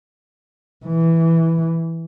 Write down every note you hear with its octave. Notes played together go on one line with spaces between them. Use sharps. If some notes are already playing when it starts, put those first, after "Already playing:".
E3